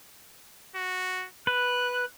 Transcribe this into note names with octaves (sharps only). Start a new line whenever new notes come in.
F#4
B4 F#6